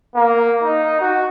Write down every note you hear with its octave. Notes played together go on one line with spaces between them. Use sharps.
A#3
D#4
F#4